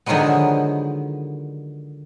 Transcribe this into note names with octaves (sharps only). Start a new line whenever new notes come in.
D3 D#3 F3 F#3 G#3 B3